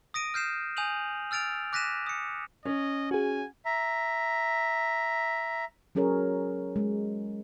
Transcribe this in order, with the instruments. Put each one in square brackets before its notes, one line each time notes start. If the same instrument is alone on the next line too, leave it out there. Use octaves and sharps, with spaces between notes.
[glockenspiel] D#6 A#6 D7 D#7
F6 G6 C7 E7
G#5 D#6 G6 D#7 F7 F#7
E6 F6 A6 D7 F7
D6 F#6 A#6 B6 D#7 E7
D#6 C#7
[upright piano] C#4 [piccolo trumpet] D#5
[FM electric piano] F#4 G#4 [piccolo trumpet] G#5
[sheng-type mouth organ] E5 A#5
[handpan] F#3 C#4 G#4 A#4 C#5
G#3